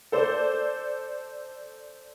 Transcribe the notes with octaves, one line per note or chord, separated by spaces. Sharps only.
A4 C5 D5